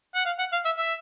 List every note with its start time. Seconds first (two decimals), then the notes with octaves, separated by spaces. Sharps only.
0.15 F#5
0.26 F5
0.39 F#5
0.53 F5
0.65 E5
0.78 E5